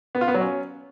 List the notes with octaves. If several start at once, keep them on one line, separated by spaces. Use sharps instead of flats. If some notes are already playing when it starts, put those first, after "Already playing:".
B3
F4
B3
F#3
C#4